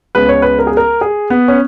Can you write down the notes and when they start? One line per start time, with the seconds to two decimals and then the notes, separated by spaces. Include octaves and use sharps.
0.15 C#2 C#3 G#3 B3 B4
0.29 C#5
0.42 B4
0.59 A#4
0.67 G#4
0.77 A#4
1.01 G#4
1.30 B3
1.48 C#4